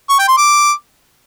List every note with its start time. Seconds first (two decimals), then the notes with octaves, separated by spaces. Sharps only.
0.10 C#6
0.19 G5
0.28 C6
0.37 D6